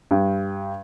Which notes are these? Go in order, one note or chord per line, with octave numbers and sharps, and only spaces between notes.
G2